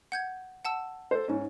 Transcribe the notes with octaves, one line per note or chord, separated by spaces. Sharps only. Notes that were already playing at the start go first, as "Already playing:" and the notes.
F#5 G6 G#6
F#5 A5 E6
A4 C5
G#2 C#4